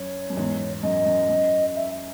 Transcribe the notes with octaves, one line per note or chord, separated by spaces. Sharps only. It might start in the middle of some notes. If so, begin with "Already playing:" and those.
Already playing: F#2 C#5
F#2
E2 G#2
F#2 D#5
F#2
F#2
E5